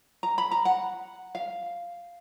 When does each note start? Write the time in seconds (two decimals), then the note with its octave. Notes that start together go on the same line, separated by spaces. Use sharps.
0.23 A#5
0.38 B5
0.51 A#5
0.65 F#5
1.35 F5